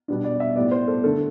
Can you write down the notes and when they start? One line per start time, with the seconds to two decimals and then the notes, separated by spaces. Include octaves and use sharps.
0.08 B2 G3 B3 D4
0.24 D5
0.40 E5
0.56 A2 G3 B3 D5
0.71 C5
0.88 A4
1.04 D3 A3 A4